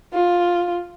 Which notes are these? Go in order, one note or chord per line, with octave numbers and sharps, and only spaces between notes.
F4